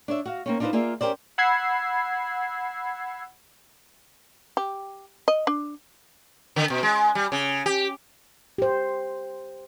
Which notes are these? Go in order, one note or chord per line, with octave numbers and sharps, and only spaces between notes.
D4 C#5 E5
F#4 F5
A#3 C4 C#4
D4 D#4 F4 G#4 B4 C5
A#3 F4 G#4 D5 E5
C#4 G4 A#4 C5 D5
F#5 B5 E6 G#6 C7
G4
D#5
D4
D3
B2
G#3
G3
C#3
G4
G4 C5